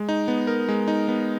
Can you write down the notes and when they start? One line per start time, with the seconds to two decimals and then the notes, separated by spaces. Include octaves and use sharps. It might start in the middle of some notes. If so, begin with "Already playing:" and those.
Already playing: G#3
0.09 D#4
0.28 B3
0.47 A#4
0.69 G#3
0.88 D#4
1.08 B3